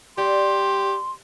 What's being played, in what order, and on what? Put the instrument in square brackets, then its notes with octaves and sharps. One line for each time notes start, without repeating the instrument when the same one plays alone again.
[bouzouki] G3 [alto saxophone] G4 [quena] C6